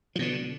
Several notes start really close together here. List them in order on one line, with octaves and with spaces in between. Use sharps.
F3 B2 D3